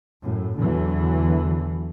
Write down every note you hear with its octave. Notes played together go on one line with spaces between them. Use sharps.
F#2 A2
E2 D3 E3 F#3